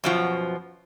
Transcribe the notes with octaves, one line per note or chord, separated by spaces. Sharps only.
F#2 B2 F3